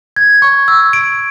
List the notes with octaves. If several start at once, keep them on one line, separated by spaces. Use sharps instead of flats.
G#6
C#6
E6
D7